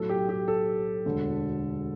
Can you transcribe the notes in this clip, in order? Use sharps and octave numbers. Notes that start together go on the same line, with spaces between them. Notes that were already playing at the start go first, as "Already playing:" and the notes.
Already playing: B1 A2 F#3 A4
G4
G4
A4
E1 D2 D3